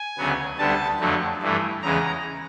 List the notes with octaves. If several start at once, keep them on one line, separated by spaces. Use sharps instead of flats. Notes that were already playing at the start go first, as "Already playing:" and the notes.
Already playing: G#5
D2 C#3 F#3 B3
D2 D3 G3 B3 A5
F2 D3 F#3 A3
G2 E3 A3
E2 C#3 E3 G#3 A#5